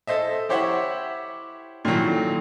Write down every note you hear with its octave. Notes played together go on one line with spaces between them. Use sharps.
A4 C5 D#5 E5
E4 G4 C5 C#5 E5 F#5
A#2 D#3 E3 F#3 A3